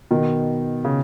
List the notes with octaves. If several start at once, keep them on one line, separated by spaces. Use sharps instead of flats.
B2 D#3
C#3